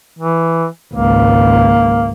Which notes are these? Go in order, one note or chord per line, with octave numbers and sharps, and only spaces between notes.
E3
G#1 C#2 A#3